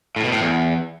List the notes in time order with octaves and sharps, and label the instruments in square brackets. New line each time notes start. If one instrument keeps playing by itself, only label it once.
[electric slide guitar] A2
B2
A2
E2